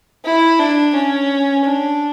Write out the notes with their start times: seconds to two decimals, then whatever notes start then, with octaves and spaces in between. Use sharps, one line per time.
0.25 E4
0.59 D4
0.94 C#4
1.64 D4